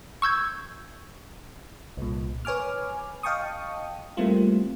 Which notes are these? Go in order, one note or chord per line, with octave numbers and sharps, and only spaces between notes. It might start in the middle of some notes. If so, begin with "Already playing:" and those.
C#6 E6 G6 G#6
C2 A#2
B4 C#5 G#5 D6 F6
D#5 F5 G5 A5 C#6 D#6
G3 A3 A#3 C4 E4 F4